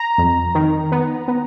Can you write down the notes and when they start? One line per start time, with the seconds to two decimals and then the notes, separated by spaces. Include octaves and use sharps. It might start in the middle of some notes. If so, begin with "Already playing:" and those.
Already playing: A#5
0.18 F2
0.55 D#3
0.92 B3
1.28 B3